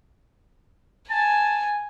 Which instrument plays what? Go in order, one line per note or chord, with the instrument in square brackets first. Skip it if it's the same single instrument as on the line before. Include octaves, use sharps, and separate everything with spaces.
[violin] G#5 [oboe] A5